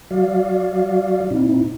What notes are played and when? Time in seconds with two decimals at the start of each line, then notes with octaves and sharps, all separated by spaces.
0.11 F#3 F#4 D5 F5
1.30 A#2 C4 D#4 E4